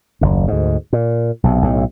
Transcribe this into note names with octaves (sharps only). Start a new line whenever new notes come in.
F#1 D#2
D2 G#2
A#2
B1 C3
B1 A2